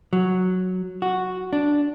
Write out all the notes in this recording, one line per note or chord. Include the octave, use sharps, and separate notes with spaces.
F#3
F#4
D4